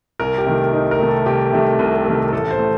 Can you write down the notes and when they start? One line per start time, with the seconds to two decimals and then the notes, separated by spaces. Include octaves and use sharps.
0.20 C2 A#4
0.38 G4
0.46 C3 D#3 A3
0.73 C2 D#4
0.91 A#4
1.00 C3 D#3 A3
1.08 A4
1.26 C2 G4
1.53 C3 D#3 A3
1.79 C2
2.06 C3 D#3 A3
2.32 A1 A4
2.51 C5
2.59 A3